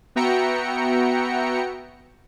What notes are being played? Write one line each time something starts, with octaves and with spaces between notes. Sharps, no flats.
B3 F#4 E5 G5 A#5 C#7